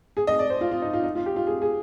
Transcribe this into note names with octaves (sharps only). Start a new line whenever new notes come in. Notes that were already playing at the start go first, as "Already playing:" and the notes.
G#4
D#5
D5
C5
F4
F4
D#4
F4
D#4
F4
G4
F4
G#4
G#4